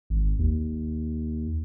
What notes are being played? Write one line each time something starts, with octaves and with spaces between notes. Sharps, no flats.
G#1
D#2